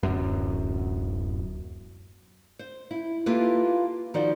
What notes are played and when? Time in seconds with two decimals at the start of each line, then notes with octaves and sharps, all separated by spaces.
0.03 D1 F#2
2.59 C5
2.91 E4
3.26 A#3 E4 F4 G4 A4 B4
4.14 D#3 F3 D#4 F#4 C5 D5